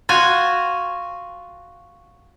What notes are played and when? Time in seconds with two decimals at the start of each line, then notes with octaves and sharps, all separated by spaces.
0.09 F4 F#4 G#5